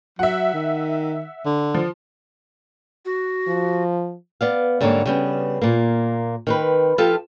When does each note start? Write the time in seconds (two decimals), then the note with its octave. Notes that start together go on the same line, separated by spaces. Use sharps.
0.19 F#3 E5 F#5
0.54 D#3
1.45 D3
1.74 F3
3.05 F#4
3.48 F3
4.41 B3 D5 F5
4.81 G#2 D3 G3 A#3 C#5
5.06 C#3 G3 B3
5.62 A#2 A#3
6.47 D#3 C4 B4
6.98 F3 F4 G4 A4